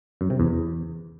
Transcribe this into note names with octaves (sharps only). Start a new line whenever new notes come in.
F#2
C3
E2